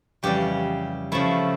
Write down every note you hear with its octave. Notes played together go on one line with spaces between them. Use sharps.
F2 C#3 E3 G3 G4
C#3 F3 A3 E4